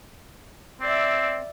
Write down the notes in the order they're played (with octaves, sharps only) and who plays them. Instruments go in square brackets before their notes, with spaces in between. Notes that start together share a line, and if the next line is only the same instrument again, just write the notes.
[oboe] C4 [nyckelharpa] D5 E5